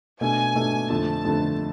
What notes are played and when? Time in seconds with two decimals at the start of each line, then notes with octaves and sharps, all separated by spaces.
0.21 B2 A3 D4 G#5
0.56 B2 A3 D4
0.90 F2 D3 A3 A5
1.25 F2 D3 A3